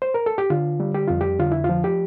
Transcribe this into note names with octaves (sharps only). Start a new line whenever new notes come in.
C5
A#4
A4
G4
D3 F4
G3
G4
F2 F4
G4
D3 F4
E4
F4
F3
G4